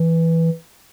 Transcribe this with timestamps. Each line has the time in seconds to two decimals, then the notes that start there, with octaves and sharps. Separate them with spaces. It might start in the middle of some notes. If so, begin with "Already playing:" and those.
Already playing: E3